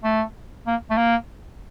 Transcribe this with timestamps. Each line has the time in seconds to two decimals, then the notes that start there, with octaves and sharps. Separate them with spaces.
0.04 A3
0.67 A#3
0.90 A3
0.97 A#3